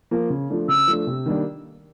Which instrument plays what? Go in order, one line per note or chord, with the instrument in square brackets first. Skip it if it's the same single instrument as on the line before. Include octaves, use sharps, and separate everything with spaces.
[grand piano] F3 A#3
C#3
F3 A3 D4
[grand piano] C#3 [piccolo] E6
[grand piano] F3 A3 D4
C3
D#3 G3 A#3 D4